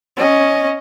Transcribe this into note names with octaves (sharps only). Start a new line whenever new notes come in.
C#4 D#5